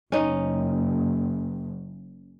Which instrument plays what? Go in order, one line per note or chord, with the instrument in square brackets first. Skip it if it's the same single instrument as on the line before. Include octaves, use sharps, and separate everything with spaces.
[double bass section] F#1 [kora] C#4 D#4